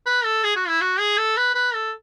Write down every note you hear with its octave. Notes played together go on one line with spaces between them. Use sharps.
B4
A4
G#4
F#4
E4
F#4
G#4
A4
B4
B4
A4